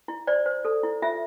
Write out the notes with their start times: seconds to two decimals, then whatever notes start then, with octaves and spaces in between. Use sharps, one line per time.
0.08 E4
0.27 C5 D5
0.46 C5
0.65 A4
0.83 E4
1.02 F4 E5